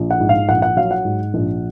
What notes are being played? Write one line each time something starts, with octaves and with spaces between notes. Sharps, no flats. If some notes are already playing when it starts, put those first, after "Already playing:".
Already playing: A#1
F#5
G#2
F5
A#1 F#5
F#5
F#3 F5
F#5
G#2
A#1